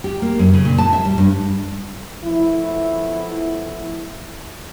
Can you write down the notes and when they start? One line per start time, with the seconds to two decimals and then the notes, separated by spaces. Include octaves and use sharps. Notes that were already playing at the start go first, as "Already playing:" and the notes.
0.04 G4
0.22 A#3
0.39 F#2
0.54 C#3
0.65 A#2
0.78 A5
0.93 E5
1.05 G3
1.18 G2
2.25 F3 A3 B3 E4